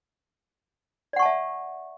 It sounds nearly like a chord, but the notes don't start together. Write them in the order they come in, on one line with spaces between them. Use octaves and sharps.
D5 F#5 C#6 A5 E5